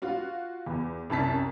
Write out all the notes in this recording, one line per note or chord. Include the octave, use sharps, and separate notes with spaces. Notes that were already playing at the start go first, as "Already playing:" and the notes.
F4 F#4 F5
E2
C2 F#2 A5 B6